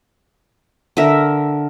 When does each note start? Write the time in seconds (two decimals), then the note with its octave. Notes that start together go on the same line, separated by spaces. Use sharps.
0.97 D3 A#4 E5